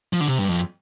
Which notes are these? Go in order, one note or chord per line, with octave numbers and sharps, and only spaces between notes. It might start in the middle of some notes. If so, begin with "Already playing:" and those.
F3
D3
C3
G2
F2